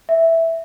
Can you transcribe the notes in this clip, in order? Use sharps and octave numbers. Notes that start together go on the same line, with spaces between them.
E5